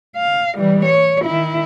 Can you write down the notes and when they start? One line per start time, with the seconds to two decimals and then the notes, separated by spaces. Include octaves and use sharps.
0.16 F5
0.57 E3 G3
0.85 C#5
1.25 D#3 E4